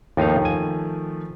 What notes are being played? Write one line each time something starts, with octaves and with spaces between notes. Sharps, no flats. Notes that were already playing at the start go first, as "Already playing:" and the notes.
D#2 D#3 F3 A3 D#4 F5
G#5